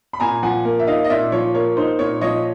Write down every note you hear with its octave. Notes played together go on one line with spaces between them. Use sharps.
B5
A#2 G#5 A#5
F3 F#5 G#5
A#3
E5
D#4 D#5 F5
D#5
A#2 D5 E5
F3 C#5
A#3 C#5
D#4 C5
A#2 C#5
F3 C#5 D#5